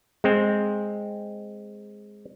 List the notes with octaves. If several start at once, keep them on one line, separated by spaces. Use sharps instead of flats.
G#3 C4